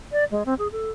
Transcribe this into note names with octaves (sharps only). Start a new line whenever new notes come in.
D5
G#3
C4
G#4
A4